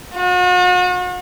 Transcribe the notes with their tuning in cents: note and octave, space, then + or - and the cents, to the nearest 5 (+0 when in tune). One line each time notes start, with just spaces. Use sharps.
F#4 -40